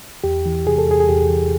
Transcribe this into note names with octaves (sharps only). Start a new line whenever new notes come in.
E2 G4
E3
C3 G#4
A4
E2 G#4
G#4
E2 G4
E3